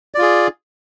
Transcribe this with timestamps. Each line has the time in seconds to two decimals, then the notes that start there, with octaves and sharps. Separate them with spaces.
0.15 D5
0.18 F4
0.22 G#4